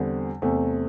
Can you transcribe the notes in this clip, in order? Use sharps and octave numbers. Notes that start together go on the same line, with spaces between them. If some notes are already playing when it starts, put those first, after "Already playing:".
Already playing: E2 D3 G3 C4
E2 C3 A3 C4